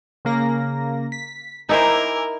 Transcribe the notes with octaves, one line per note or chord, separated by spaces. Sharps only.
C#3 A#3 A#6
B6
D#4 E4 A#4 C5 G#5 D6 E6